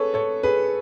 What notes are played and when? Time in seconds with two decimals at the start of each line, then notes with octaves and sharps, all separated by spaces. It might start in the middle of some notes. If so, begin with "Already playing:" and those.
Already playing: G#4 A4 B4 C#5
0.14 A4 C#5
0.43 G#4 B4